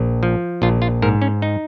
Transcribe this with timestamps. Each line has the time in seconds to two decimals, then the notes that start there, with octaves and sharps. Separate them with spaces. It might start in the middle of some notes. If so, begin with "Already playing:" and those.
Already playing: A#1
0.23 F3
0.62 A#1 F4
0.82 F4
1.02 G#2 A#4
1.22 C#4
1.42 D#4